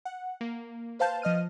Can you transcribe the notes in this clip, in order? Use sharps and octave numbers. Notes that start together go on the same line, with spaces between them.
F#5
A#3
B4 C5 F5 A5 G6
F3 D#5 F6 D#7